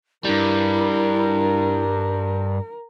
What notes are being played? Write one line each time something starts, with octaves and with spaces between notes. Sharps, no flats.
G2 G3 E4 A#4